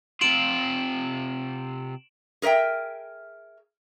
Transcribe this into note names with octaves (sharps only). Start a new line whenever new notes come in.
C3 F4 D7 E7 F#7
G#4 A#4 C5 E5 G5